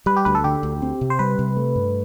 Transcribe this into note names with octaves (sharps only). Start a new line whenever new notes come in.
G3 B4
G4
D2 B4
A4
D3 G4
D2
C4
C3
C5
G3 B4
C3
A3
G2